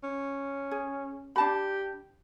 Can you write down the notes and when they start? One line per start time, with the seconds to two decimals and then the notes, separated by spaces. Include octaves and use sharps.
0.03 C#4
0.71 G#4
1.36 D4 G4 A5 B5